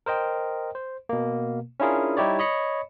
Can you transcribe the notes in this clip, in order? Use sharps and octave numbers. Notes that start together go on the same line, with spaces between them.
A#4 C5 D#5 G5
C5
B2 A#3
C#4 D4 E4 F4 G#4 A#4
G3 D#4 E4 G4 C#5 D5
C#5 D#5 B5 C#7